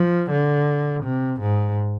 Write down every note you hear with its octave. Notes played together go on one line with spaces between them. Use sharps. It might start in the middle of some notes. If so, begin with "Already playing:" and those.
Already playing: F3
D3
C3
G#2